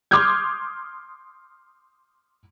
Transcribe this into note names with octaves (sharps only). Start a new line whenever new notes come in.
C6 D6 D#6 F6 G6 G#6